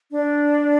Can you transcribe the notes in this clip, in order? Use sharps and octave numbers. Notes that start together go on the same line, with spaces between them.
D4